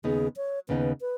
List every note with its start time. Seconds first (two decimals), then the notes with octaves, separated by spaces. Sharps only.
0.04 D#2 C#3 B3 D#4 G#4
0.37 C#5
0.69 D#2 C#3 B3 D#4 B4
1.01 B4